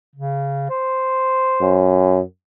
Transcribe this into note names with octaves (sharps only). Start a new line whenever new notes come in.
C#3
C5
F#2